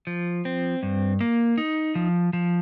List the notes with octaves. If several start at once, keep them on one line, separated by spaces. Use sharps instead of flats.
F3
C4
G2
A#3
D#4
F3
F3